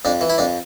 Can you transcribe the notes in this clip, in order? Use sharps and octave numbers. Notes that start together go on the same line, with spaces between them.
F2 D4
E3
E4
F2 D4